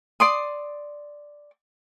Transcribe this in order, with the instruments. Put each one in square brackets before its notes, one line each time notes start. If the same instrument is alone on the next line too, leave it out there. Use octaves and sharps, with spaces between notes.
[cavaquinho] D5 C6 D#6